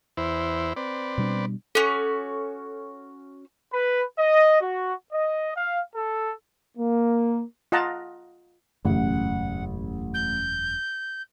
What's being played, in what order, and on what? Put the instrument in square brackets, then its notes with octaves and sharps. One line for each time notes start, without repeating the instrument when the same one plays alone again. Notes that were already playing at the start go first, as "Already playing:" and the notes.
[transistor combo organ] E2 E4 C5
C4 B4 D5
[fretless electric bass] B2 G3 D4
[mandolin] C#4 F#4 [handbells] A4
[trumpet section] B4
D#5
F#4
D#5
F5
A4
[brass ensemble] A#3
[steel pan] F4 D#5 F#5 A5 A#5
[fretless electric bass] E1 F#2 C#3 [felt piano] A1 [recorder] F#5
[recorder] G6